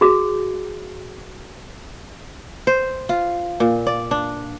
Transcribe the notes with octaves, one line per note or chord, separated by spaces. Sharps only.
F#4 G#4
C5
F4
A#2
D5
D4